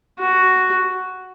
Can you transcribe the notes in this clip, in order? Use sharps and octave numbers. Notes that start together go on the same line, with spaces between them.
F#4